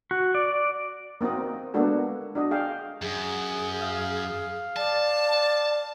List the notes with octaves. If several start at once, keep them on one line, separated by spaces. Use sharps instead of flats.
F#4
D5
A#3 C4 D#4 F#4 D#5
G#3 A#3 B3 D4 F#4 A4
D4 F#4 D#5
G#4 F5 G5
F#2 G#4
F5
D5 A5